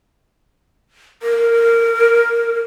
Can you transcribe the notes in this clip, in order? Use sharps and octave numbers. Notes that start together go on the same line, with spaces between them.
A#4